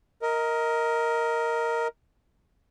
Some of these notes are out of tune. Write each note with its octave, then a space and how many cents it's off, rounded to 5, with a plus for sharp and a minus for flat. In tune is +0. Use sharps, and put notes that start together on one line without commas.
A#4 +0 D#5 +20